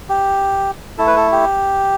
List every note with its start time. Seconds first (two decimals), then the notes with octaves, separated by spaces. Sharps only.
0.09 G4
0.98 A3 E4 A4
1.07 B4
1.16 A4
1.32 G4